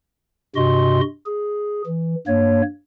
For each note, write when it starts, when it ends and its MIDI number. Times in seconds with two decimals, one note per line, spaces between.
0.56 1.01 43
0.56 1.01 48
0.56 1.01 66
0.56 1.01 75
0.56 1.01 84
1.26 1.82 68
1.86 2.15 52
2.27 2.62 43
2.27 2.62 58
2.27 2.62 73